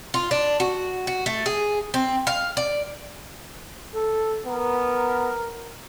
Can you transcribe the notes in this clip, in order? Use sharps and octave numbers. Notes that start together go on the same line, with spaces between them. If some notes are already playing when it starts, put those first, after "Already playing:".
F4
D4
F#4
F#4
A3
G#4
C4
F5
D5
A4
B3 A#4